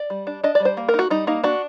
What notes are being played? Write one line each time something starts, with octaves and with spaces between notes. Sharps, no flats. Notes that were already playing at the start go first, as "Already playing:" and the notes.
Already playing: D5
G3
D4
D4 D#5
D5
G3
C5
A#3
A#4
D#4
F#4
G3 D#4
A#3 D#4
D4 F#4